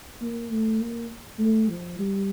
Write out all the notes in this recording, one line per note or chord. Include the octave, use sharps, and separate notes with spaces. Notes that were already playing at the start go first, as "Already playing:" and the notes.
A#3
A3
A#3
A3
F3
G3